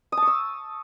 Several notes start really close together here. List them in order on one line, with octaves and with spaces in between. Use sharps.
D#6 A5 C#6 E6